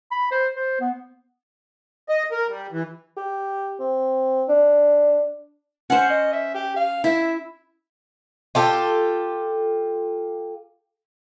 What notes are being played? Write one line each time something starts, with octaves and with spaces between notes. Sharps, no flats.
B5
C5
C5
B3
D#5
A#4
G3
E3
G4
C4
D4
C#4 C5 F#5
D#5
E5
G4
F5
E4 E5
F4 G4 A4